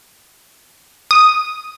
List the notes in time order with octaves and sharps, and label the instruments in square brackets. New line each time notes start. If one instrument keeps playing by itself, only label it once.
[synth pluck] D#6